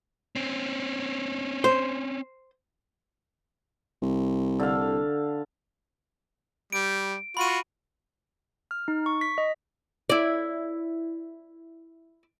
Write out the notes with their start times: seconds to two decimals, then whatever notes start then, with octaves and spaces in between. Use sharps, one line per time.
0.35 C4 C#4
1.64 C5
4.02 C2
4.60 D3 F5
6.72 G3 D7
7.37 F4 F#4 B5 D#7
8.71 F6
8.88 D#4
9.06 C#6
9.21 B6
9.38 D#5
10.10 E4 D5